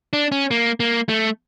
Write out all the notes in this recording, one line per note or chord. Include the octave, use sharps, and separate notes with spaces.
D4
C#4
A#3
A#3
A3